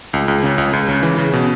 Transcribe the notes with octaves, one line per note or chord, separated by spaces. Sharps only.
C#2
C#2
C#3
C#2
C#2
C#3
E3
C#3
B2